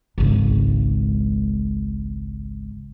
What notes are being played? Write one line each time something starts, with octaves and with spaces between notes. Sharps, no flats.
G#1 C#2